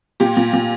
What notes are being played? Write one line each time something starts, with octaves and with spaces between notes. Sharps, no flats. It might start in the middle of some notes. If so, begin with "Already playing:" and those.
A#2 G4
A#2
A#2